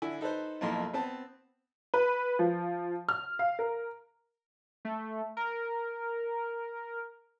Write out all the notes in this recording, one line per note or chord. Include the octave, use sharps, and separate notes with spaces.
D3 E4 G#5
D#4 A4 B4 C5
B1 F2 A#3 E4 C6
B3 C4 A5
B4
F3
F6
F5
A#4
A3
A#4